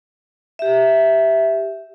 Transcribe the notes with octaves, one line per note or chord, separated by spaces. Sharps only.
G4 E5